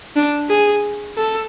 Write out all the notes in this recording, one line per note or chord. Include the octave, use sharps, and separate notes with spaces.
D4
G#4
A4